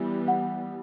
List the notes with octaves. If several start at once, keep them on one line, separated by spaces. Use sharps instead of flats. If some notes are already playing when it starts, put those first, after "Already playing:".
Already playing: E3 G3 B3
F#5